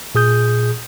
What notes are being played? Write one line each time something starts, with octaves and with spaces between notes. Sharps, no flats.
A#2 G#4 D#6 G6